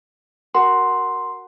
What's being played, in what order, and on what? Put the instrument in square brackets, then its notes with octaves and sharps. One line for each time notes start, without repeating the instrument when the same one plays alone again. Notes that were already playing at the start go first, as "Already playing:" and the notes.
[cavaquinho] F#4 [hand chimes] A#4 C6